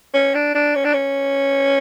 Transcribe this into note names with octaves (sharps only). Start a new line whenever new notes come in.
C#4
D4
D4
C#4
D4
C#4